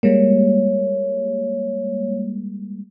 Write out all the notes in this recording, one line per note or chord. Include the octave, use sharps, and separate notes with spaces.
G3 G#3 A#3 C#5